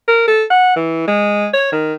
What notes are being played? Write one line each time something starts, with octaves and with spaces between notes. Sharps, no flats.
A#4
A4
F#5
E3
G#3
C#5
D#3